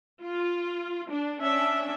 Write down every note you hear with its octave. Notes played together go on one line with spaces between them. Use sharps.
F4
D4
C#4 D4 E5